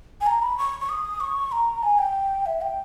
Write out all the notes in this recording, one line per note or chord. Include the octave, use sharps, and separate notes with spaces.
G#5
A#5
B5
C#6
C#6
D#6
C#6
A#5
G#5
G5
E5
G5